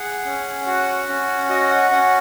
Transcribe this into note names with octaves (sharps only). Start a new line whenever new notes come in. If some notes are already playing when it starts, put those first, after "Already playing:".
Already playing: G#4 F#5
C#4
F#4
C#4
F#4 D#5
F#5
C#4 F#5